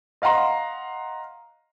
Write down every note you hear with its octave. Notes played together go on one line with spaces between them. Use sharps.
D#5 F5 F#5 A#5 C6